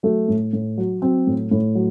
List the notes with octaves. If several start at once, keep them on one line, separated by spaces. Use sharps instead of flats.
F#3 A3
A2
A2
F#3
F#3 C4
A2
A2
F#3